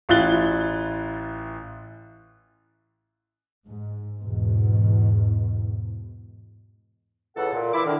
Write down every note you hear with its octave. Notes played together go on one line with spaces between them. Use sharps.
A1 E4 F4 F#6 A6 G7
G#2
E2 G#2 B2
C#2 C#3 E3 A4 F#5
A#2
E3 E4 D6
D3 D#3